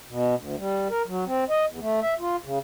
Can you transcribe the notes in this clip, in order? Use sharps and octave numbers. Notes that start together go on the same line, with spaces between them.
B2
D2
G3
A#4
F#3
C4
D#5
E2
A3
E5
F4
C#3